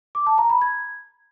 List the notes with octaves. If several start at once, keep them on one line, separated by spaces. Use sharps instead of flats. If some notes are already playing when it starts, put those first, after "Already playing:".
D6
A5
A#5
B5
G#6